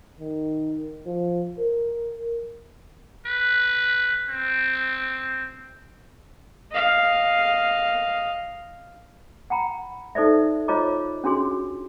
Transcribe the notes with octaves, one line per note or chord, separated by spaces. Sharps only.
D#3
F3
A#4
B4
C4
D#5 F5
F#5 G5 A#5 B5
D#4 A4 C5 D5 E5
F4 C5 C#5 D#5 A#5 D6
C#4 D4 F#4 G#4 C6